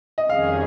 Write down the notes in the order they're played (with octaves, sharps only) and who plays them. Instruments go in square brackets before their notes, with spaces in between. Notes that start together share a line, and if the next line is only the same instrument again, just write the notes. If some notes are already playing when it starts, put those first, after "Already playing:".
[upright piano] D#5
[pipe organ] F2 D#3 G3 C#4 G#4 [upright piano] F5